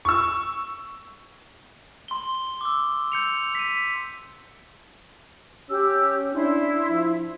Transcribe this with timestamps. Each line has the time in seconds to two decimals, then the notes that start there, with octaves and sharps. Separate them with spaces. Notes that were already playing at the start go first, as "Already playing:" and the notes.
0.05 C#6 E6
2.08 C6 G7
2.61 D6 E6
3.12 E6 G6 C#7 F7
3.55 B6 D#7
5.70 C#4 G4 E6
6.34 D4 E4 C6
6.89 F3